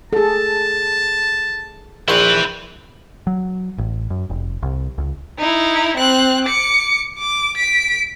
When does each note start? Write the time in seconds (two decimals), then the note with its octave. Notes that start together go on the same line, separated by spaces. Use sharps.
0.13 G#4 A4 A5
2.09 A#1 E4 B4 G5 C6
3.27 F#3
3.78 A1
4.10 F#2
4.30 F1
4.63 C2
4.98 C#2
5.39 D#4 E4
5.97 C4 F#6
6.45 D6 C#7
7.19 D6
7.56 B6 D7